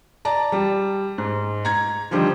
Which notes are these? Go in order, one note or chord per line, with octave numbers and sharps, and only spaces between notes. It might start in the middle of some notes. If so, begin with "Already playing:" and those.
D5 A5 A#5
G3
G#2
A#5 G#6
D3 D#3 F3 G3